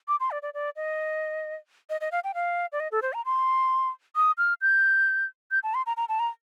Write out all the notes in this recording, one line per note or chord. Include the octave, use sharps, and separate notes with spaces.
D6
C6
D5
D5
D5
D#5
D#5
D#5
F5
G5
F5
D5
D#5
A4
C5
A#5
C6
D#6
F6
G6
G6
A5
C6
A#5
A#5
A5
A#5